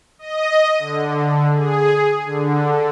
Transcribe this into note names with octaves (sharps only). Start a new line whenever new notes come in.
D#5
D3
G#4
D3